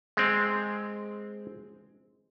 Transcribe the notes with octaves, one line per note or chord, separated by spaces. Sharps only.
G#3 C4